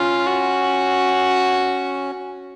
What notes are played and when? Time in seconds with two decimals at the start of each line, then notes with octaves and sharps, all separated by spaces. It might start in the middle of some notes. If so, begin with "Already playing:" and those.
Already playing: C#4 F4
0.27 F#4